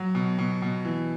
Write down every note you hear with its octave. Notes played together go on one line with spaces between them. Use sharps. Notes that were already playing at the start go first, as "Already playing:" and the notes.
Already playing: F#3
B2
B2
B2
E3